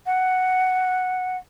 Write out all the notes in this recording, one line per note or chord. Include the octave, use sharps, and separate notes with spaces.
F#5